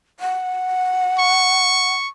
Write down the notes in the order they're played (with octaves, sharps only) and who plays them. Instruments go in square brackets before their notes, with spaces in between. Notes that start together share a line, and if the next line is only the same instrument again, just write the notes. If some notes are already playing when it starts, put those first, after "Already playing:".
[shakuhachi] F#5
[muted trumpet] C#6